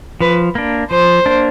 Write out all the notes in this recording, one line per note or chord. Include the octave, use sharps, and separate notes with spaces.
F3 B4
A#3 D4
F3 C5
A#3 D4